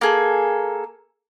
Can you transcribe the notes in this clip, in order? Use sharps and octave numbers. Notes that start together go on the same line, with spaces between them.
A#3 G#4 A4